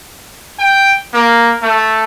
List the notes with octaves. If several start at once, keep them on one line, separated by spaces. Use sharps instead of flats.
G5
A#3
A3